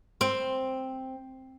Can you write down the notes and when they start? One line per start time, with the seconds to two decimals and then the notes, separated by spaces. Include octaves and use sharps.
0.21 C4